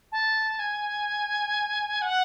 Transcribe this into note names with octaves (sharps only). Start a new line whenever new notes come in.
A5
G#5
F#5